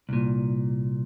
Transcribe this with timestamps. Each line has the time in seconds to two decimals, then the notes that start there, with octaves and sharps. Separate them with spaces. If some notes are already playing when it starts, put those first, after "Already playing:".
0.09 C2 A#2